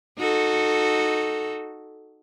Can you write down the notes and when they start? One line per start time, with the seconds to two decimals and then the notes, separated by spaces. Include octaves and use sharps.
0.18 D#4 F#4 A4